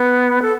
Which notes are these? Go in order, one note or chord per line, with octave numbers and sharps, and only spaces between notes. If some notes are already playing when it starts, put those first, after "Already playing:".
Already playing: B3
A4